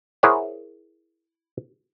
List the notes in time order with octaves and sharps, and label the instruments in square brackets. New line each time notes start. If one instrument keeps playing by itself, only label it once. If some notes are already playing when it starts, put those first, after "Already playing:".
[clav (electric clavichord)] E4 G#4 A#4 C5 C#5 F#5